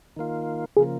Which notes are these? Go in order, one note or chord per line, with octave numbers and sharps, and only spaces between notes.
D#3 A#3 F4
C#3 F3 A#3 G#4